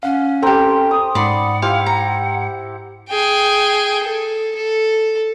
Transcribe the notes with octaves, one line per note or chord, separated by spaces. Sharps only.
C#4 F5 F#5
C4 G4 A4 A#4 C6 G6
D#6
G#2 D5 F#5 B5 C6
E4 G4 C5 F5
A#5
G#4 G5
A4
A4